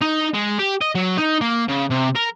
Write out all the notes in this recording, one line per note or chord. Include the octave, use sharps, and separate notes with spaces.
D#4
G#3
G4
D#5
F#3
D#4
A#3
C#3
C3
A#4